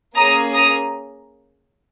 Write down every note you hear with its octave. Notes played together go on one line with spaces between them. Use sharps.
A#3 C#4 G#4 A#5 D#6
A#5 D#6